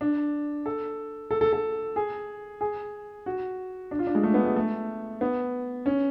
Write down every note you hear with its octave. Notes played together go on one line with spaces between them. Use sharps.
D4
A4
A4
A4
A4
G#4
G#4
F#4
D4
F4
D4
G#3
A3
B3
G#3
A3
B3
C#4